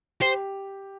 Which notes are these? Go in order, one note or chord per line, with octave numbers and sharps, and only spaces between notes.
G4 C5